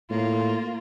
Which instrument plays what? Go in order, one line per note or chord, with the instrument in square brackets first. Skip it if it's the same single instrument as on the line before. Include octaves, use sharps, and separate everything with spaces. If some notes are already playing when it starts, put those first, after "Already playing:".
[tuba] A2 [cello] A#3 F4